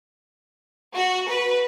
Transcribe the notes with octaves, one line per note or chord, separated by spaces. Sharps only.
F#4
B4